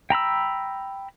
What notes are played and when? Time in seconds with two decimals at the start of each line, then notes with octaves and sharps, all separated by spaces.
0.10 G5 A#5 B5 E6